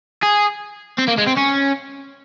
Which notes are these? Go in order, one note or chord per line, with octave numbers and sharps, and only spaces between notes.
G#4
C4
A#3
G#3
C4
C#4